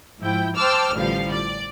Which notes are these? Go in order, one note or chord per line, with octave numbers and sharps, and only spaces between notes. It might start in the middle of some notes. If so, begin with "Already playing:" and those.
G#2 F3 E4 G5
C5 G5 A5 D6 E6 F6
A1 D3 F3 G3 F5
D5